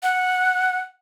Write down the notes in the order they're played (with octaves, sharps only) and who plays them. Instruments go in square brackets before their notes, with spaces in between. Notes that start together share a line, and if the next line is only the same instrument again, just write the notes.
[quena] F#5